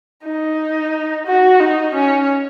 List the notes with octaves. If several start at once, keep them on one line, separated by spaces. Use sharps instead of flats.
D#4
F#4
D#4
C#4